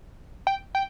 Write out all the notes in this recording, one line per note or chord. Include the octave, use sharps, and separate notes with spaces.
G5
G5